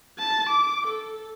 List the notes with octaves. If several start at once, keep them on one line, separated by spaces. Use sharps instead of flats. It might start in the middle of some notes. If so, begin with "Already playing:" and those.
A5
D6
A4